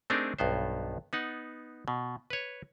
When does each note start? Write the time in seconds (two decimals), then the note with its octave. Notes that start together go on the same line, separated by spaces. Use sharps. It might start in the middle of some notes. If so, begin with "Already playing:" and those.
0.10 A3 C4 D4 D#4 G#4 A#4
0.39 B1 G2 B3 C5
1.13 B3 D#4 F#5
1.88 B2
2.30 B4 C#5